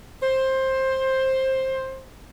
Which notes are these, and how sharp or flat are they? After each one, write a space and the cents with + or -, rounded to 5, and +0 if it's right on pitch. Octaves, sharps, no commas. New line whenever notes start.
C5 +15